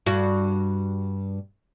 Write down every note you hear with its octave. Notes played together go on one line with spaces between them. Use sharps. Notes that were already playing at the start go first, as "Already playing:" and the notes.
G2 F#4